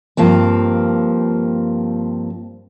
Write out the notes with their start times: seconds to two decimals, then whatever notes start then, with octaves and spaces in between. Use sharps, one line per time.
0.17 G2 F3 A#3 C4